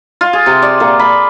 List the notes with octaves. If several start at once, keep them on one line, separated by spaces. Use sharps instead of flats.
F4
G#4
C3
D5
A#2
B5